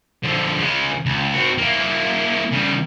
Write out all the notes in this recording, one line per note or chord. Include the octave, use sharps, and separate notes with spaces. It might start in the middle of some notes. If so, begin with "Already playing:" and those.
D3 F3
C#3 G#3
C#2
C4 F#4
A#3 E4
C#3 G3